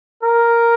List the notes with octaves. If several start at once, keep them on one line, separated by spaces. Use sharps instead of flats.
A#4